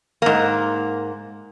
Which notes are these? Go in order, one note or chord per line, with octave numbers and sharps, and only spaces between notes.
G#2 A#3